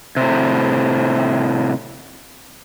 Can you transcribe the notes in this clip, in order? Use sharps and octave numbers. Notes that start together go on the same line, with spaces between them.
A2 C3